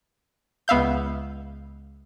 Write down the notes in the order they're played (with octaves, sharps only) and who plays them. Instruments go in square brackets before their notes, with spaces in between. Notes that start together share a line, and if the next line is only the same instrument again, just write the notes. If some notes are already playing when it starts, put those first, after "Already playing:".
[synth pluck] C#2 B3 E5 F5 G6